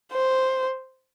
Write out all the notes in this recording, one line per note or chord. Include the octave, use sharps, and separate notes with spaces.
C5